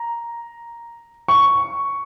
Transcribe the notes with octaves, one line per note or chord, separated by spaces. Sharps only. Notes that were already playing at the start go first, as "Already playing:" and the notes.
Already playing: A#5
C#6